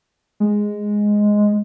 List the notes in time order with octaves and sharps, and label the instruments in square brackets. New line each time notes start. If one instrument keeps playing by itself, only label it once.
[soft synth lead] G#3